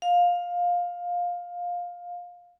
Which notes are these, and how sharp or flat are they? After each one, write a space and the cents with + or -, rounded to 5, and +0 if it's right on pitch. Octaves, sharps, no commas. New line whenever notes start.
F5 +15